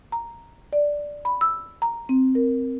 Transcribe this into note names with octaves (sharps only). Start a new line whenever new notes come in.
A#5
D5
B5
E6
A#5
C4
A#4